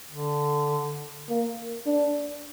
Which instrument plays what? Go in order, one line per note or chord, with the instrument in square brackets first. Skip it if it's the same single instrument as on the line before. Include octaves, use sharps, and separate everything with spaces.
[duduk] D3
[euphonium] A#3
D4